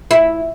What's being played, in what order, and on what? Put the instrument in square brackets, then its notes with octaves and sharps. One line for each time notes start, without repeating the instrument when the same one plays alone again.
[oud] E4